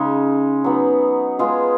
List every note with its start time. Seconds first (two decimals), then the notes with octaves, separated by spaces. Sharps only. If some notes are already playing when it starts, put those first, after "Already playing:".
Already playing: C#3 G#3 C#4 D#4 G#4
0.64 F#3 B3 D#4
1.39 G#3 B3 F4 G#4